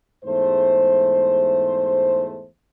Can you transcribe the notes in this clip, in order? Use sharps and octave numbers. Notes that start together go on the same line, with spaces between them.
E2 G#2 G#3 A3 C5